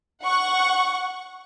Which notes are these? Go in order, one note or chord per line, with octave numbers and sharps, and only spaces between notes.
F#5 C#6